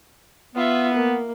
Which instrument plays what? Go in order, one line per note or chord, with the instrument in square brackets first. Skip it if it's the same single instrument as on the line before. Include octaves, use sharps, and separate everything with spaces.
[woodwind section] B3 [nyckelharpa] F4 E5
[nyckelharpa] A#3